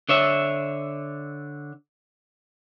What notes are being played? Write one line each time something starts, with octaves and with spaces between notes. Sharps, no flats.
D3 C#5 E5